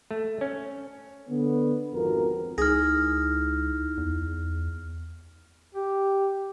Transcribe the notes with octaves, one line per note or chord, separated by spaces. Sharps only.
A3
C#4
D3 B3
G#1 F2 F#4 A#4
C#2 D#4 E4 G#4 F6 A#6
E2
G4